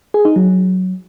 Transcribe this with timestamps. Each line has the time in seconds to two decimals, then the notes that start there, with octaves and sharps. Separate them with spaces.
0.14 G#4
0.25 D#4
0.36 F#3